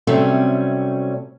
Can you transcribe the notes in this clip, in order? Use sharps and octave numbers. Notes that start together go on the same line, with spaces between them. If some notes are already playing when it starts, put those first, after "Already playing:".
C3 F#3 G3 A3 C4 C#4